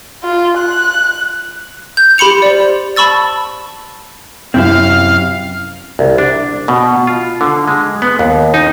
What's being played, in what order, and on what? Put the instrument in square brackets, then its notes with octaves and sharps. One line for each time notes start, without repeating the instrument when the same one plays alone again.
[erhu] F4
F#6
[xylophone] G6
G4 B5 C6 C#7 F7
C5 D5
A5 B5 C#6 E6 A6
[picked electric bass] F#2 C3 [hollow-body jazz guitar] C4 E4 E5 [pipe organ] F5
[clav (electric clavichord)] C2
D4
B2
F4
D3
G#3
B3
D#2
D#4